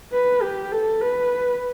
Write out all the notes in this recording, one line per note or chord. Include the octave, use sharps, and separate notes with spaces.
B4
G4
A4
B4